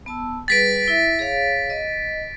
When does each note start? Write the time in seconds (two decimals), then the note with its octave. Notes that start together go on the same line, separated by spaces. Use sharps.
0.06 B3 A5 E6
0.48 G3 G#4 B4 A6 B6 D7
0.88 E4 E5
1.19 G#4 C#5 F5
1.70 D#5